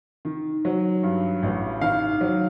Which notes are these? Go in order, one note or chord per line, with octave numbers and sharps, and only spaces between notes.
D#3
F#3
G2
A1
D#3 F5
F#3